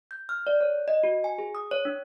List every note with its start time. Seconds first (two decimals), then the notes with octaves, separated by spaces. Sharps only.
0.11 G6
0.29 F6
0.47 D5
0.61 C#5
0.88 D#5
1.03 F#4
1.24 G#5
1.38 G#4
1.55 D#6
1.71 C#5
1.85 D4